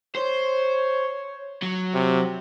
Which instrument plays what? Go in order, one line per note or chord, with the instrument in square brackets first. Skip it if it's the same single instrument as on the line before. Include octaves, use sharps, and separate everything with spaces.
[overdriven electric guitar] C5 [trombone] C#5
[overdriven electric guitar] F#3
[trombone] C3